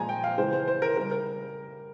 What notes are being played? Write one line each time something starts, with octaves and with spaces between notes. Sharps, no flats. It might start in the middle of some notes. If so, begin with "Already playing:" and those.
Already playing: A#2 F3 G#3 G#5 A#5
G5
F5
C#3 E3 G#3 C5
C5
C5
A#4
C#3 G3 A#4
A#4